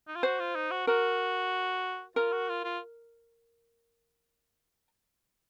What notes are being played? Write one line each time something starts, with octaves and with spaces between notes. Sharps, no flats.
D#4
F4
F#4 C5
F4
D#4
F#4
F#4 A#4
F4 A#4
F#4
F4
F4